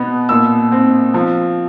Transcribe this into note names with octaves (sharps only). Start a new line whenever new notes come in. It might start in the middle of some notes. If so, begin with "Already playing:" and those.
Already playing: B2 B3
A#2 E6
C4
F3